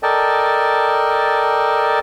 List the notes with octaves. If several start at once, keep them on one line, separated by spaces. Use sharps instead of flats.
A4 A#4 D5 D#5 G5 A5